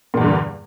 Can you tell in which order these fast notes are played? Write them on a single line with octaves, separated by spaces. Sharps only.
A#2 E2 G2 D3